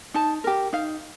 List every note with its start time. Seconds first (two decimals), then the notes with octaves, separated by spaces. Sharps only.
0.14 D#4 A5
0.44 G4 A#4
0.73 D#4 F5